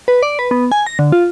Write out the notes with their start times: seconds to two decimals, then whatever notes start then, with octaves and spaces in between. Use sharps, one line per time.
0.08 B4
0.23 D5
0.39 B4
0.51 B3
0.72 G#5
0.87 A#6
0.99 D3
1.12 F4